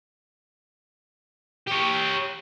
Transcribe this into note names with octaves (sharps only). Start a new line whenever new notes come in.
G4 C#5